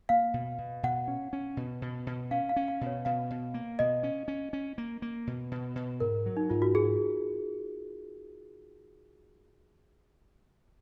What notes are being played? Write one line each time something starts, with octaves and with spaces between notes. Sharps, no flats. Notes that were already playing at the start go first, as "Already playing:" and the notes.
A#3 F5
B2
B2
B2 F#5
C#4
C#4
B2
B2
B2
C#4 F5
F5
C#4
F5
B2
C#5
B2 F5
B2
A#3
B2 D#5
C#4
C#4
C#4
A#3
A#3
B2
B2
B2
G#2 A#4
F#3
D#4
G#2 F4
F#4
G#2 G#4